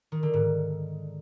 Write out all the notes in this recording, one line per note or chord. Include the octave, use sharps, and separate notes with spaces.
D#3
D3
G#2